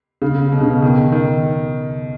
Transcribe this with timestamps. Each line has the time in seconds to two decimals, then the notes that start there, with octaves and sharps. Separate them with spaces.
0.22 C#3
0.52 B2
0.61 C#3
0.70 B2
0.82 D#3
1.12 D#3